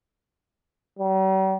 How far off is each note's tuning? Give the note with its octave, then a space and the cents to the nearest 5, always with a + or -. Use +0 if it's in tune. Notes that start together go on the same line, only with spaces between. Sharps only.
G3 -45